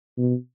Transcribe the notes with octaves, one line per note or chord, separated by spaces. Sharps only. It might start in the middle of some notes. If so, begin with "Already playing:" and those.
B2